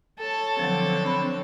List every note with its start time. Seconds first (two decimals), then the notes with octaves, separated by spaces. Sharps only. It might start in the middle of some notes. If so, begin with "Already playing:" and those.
0.20 A4 C#5 A5
0.59 D3 F3 F#3 C4
1.06 B5